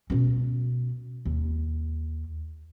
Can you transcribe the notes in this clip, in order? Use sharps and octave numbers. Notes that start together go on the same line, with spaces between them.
B2 C#4
D#2